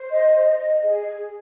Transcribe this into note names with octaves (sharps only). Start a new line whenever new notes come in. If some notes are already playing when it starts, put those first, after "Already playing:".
Already playing: C5
D#5
D#5
G#4